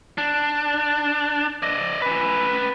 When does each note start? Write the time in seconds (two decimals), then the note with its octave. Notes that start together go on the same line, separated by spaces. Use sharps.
0.18 D4
1.63 D5 D#5
2.02 C#4 B4